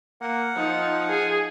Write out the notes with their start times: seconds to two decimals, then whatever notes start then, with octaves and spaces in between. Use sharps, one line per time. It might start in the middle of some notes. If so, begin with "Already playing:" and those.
0.21 A#3 F#5
0.56 F3 D#4
1.09 G#4